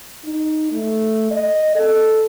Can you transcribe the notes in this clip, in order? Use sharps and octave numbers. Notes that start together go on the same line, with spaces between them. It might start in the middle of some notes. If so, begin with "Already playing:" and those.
D#4
A3
D#5
A4